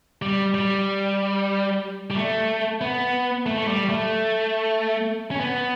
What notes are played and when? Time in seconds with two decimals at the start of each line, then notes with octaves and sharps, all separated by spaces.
0.22 G3
0.54 G3
2.11 G3
2.16 A3
2.81 B3
3.46 A3
3.58 A3
3.67 G3
3.89 A3
5.31 C#4
5.40 B3